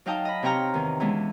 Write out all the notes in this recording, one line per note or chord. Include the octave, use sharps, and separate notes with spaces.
F#3 D#4 F5 G5 A5 D#6
D#5 B5
C3 C4 C#5 G5 A#5 F6
E2 D#3
E3 G#3 B3 C#4 D4